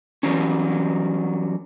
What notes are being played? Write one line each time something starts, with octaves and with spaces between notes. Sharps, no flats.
E3 F#3 G3 C#4